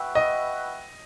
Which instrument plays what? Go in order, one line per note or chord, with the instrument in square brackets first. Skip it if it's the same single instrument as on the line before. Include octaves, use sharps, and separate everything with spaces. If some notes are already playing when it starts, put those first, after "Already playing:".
Already playing: [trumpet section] F#4 B4 E5 G5
[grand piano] D#5